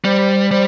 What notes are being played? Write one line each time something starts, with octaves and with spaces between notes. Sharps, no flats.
G3 C5
G3 C5